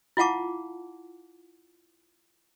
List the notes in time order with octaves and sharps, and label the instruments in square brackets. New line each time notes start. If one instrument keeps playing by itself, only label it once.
[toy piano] E4 F4 F5 F#5 A5 D6